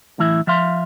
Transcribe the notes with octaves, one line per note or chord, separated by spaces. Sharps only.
F#2 A2 E3 E4 E5
F3 E5 F5 C6